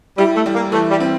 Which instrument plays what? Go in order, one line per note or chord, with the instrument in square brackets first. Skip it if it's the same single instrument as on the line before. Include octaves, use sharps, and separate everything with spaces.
[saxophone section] G3 [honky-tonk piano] E4
[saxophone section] A3
[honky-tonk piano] G3
[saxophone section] A#3
[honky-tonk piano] E3 [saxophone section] A3
[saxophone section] G3
[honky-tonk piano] C4